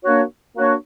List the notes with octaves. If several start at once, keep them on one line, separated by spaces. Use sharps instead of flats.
A#3 D4 F#4 C#5
A#3 D4 F#4 C#5